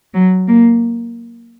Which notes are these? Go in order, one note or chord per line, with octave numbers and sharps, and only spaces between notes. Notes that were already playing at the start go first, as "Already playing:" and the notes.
F#3
A#3